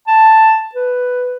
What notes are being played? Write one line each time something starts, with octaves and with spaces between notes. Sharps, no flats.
A5
B4